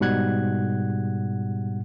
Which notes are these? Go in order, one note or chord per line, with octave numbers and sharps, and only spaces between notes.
G#2 B2 G3 F#5 F#6 G#6